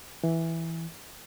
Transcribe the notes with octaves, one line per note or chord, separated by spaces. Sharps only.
E3